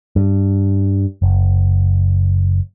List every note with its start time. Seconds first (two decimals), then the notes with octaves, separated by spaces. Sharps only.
0.16 G2
1.22 F#1